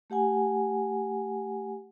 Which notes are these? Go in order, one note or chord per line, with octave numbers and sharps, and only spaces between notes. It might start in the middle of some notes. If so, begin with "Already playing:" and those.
A3 G4 F#5 G#5